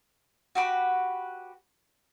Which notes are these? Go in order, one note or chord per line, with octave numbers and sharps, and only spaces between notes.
F#4 G4 B4